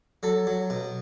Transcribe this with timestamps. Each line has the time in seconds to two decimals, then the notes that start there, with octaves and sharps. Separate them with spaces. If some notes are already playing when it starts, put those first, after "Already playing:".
0.23 F#3 A4
0.47 F#3
0.70 B2